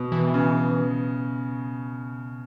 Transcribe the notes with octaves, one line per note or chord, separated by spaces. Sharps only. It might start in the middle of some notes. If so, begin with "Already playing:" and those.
Already playing: B2
E3
C#3